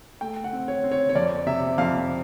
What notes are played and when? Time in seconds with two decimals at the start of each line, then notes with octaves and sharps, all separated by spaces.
0.21 A3 G5
0.44 F#5
0.53 C4
0.68 C#5
0.84 C4
0.92 C#5
1.09 C#5
1.15 F2 D5
1.47 C3 E5
1.78 F2 F5